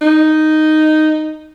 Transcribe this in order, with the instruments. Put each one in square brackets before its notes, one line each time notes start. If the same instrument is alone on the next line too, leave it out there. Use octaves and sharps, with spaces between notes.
[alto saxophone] D#4